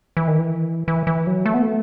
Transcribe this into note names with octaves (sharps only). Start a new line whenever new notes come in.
E3
D#3
E3
E3
E3
F#3
A3
B3
A3